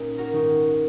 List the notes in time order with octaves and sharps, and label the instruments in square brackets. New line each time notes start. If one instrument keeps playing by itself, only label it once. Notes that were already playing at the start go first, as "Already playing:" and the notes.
Already playing: [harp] A#2 C#4 D#4
F#4 A#4
G#2 D#3 D#4 F#4